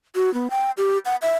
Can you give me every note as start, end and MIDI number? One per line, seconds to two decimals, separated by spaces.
0.15 0.33 66
0.34 0.50 59
0.50 0.71 79
0.77 0.98 67
1.06 1.16 78
1.22 1.37 76